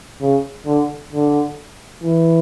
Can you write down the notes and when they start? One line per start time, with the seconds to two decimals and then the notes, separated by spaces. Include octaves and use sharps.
0.21 C#3
0.66 D3
1.12 D3
2.03 E3